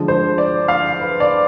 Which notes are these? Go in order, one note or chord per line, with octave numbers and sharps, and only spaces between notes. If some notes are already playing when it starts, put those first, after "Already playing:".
Already playing: D3 F3 G#3
C5
D5
F5
B4
D5